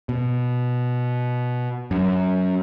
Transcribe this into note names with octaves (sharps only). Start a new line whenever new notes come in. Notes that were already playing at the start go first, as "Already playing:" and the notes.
B2
F#2